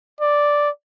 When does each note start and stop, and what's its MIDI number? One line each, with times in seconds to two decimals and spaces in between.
0.20 0.70 74